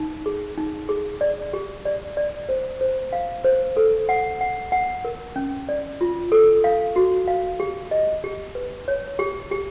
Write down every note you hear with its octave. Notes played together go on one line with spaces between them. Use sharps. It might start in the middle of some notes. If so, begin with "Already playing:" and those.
Already playing: D#4
G#4
D#4
G#4
D5
G4
D5
D5
C5
C5
F5
C5
A4
F#5
F#5
F#5
A#4
C#4
D5
F4
A4
F5
F#4
F5
G4
D#5
G4
B4
C#5
G4
G4